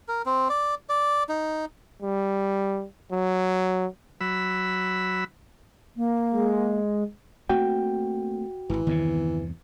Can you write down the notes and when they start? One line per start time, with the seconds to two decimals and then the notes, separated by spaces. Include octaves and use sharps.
0.08 A#4
0.26 C4
0.49 D5
0.89 D5
1.29 D#4
2.02 G3
3.12 F#3
4.21 F#3 B5 E6
5.97 A#3
6.31 G#3
7.49 A3 A#3 C4 F#4 G5
8.70 D1 G#1 E3
8.87 E2 G2 C3 D#3 B3